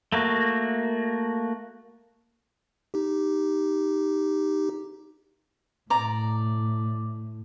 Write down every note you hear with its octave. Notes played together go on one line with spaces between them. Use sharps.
A3 A#3 F#4
D#4 G4
A2 D5 A#5